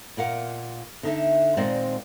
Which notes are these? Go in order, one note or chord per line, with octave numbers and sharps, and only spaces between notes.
A#2 A#4 F5 F#5
D3 D#4 A4 E5
A#2 D#3 G#3 C4 C5 D5